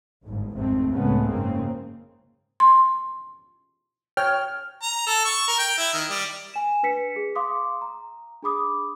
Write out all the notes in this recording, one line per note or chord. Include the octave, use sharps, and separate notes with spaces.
G1 D2 G#2
G#1 F2 G#2 C3 A3 C4
C#2 A2 C#3 G#3 A3 B3
F#1 G#2 C#3 A#3 C4
C6
C#5 G5 F6
A#5
A4
C#6
A#4
G5
E4
D#3
G3
G#5 E7
D4 B4 B6 C#7
G#4
F5 C6 D6 D#6
A#5
D4 G#4 B5 D6 D#6